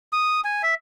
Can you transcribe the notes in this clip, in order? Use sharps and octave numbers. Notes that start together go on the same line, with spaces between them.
D#6
G#5
E5